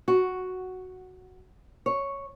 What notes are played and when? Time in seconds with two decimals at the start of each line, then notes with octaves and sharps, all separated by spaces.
0.08 F#4
1.86 C#5